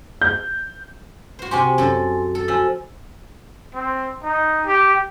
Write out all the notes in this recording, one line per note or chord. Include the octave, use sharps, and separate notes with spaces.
G6
F#4 C5
C3 F#4 G4 G#5 C6
F#2 A4
A4
F3 F#4 G#5 E6
C4
D#4
G4